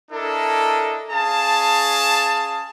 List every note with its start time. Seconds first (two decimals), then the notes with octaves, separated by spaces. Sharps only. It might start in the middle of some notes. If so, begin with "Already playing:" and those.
0.12 D4 E4 A4 A#4 D#5
1.11 C#4 G#4 F5 A5